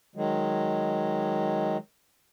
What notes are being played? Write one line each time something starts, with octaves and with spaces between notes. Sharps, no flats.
D#3 F#3 G#3